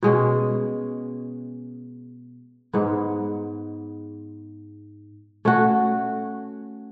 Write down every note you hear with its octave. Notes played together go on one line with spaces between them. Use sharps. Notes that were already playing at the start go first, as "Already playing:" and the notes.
B2 G#3 C#4
G#2 G#3 B3
A3 C#4 F#4